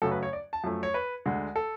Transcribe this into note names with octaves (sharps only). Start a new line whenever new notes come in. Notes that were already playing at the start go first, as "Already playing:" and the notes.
F#2 C#3 F#3 A3 A4
B4
C#5
D5
A5
F#2 F3 A3
C#5
B4
D2 D3 G#3
A4